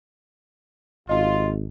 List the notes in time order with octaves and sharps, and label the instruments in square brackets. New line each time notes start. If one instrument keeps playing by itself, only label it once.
[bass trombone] G#1 [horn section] C3 F4 [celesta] D#5